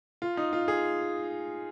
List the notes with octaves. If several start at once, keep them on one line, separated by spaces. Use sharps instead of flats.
F4
D#4
F4
G#4